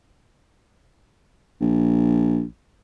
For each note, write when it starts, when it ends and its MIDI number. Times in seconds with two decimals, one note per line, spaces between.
1.61 2.43 34